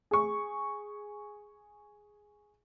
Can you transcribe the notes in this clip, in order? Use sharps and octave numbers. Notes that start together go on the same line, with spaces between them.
G#4 C#6